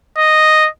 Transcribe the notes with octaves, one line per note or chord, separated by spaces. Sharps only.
D#5